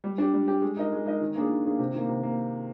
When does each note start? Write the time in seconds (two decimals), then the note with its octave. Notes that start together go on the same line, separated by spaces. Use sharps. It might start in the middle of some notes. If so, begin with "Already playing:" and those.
0.04 G3
0.18 D4 G4
0.34 G3
0.48 D4 G4
0.62 G#3
0.77 D#4 A#4 D#5
0.92 G#3
1.06 D#4 A#4 D#5
1.21 D#3
1.35 A#3 D4 G#4
1.50 D#3
1.64 A#3 D4 G#4
1.79 C3
1.93 D#3 A#3
2.09 C3
2.23 A#3